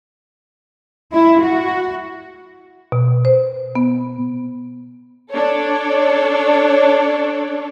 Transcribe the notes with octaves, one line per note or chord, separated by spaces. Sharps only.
E4
F#4
B2
C5
B3
D4 A4 C#5